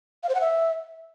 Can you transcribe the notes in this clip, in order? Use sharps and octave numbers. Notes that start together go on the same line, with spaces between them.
F5
C5
F#5
E5